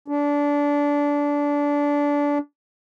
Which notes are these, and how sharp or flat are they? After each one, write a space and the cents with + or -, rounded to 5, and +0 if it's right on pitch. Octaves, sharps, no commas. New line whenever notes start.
D4 -20